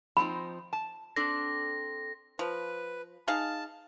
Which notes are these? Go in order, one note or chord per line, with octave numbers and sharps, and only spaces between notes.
F3 C4 D#4 B5
A5
C4 D4 A4 A#6
F3 B4
D#4 G#4 F5 A5